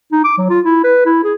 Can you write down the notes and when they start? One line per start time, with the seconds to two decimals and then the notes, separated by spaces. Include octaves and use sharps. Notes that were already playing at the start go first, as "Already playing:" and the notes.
0.12 D#4
0.24 D6
0.38 F#3
0.50 F4
0.65 E4
0.84 B4
1.06 E4
1.24 G#4